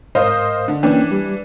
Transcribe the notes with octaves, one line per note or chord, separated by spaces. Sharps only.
G#2 A#4 C5 D#5 F5 D#6
D3
E3 A#3 C#4 D4 G5
G3